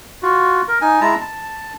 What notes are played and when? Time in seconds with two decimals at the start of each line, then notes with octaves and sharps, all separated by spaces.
0.23 F4 F#4
0.68 A#4
0.81 D#4 G#5
1.01 G#3 E4 A5 A#5
1.21 A5